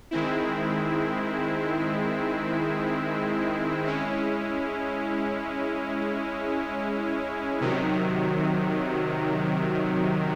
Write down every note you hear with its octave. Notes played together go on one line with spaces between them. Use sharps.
D#3 G#3 C4 E4
G#3 C#4 E4
C3 D#3 F#3